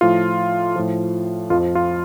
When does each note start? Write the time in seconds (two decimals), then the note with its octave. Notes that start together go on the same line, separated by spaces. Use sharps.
0.01 A2 F3 F4
0.76 A2 F3
1.50 F2 F3 F4
1.75 F4